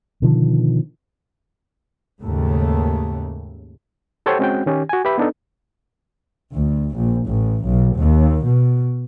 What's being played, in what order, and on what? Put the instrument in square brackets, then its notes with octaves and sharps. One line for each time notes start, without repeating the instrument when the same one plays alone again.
[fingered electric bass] B2 D3 D#3 F3
[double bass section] D#2 G#2 C#3 A3
[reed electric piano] G4 A4 C5 C#5 F#5 G5
G#3 C4 C#4 F#4 F#5 G5
D#3 C#4 G4
F#4 G#5
G4 B4 E5 B5
B3 D4 D#4 A4
[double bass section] D2
A#1
A1
B1
D#2
B2